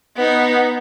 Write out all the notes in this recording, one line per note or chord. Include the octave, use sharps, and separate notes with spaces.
B3 D#4